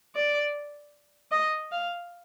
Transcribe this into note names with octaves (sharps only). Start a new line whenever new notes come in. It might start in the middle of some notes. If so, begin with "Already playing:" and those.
D5
D#5
F5